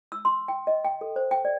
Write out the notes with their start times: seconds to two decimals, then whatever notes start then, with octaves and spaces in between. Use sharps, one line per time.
0.12 E6
0.25 C6
0.48 G5
0.67 D#5
0.85 G5
1.01 A4
1.16 C5
1.31 G5
1.45 D5